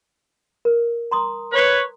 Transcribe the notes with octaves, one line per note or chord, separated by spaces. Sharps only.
A#4
A#5 C6 D#6
B4 C#5